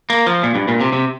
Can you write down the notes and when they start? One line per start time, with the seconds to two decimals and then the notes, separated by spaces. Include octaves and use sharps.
0.10 A#3
0.26 F3
0.43 A#2
0.55 G2
0.68 A#2
0.81 C3
0.93 C3